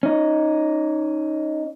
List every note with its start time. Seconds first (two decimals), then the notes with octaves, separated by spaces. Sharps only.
0.03 C#4 D#4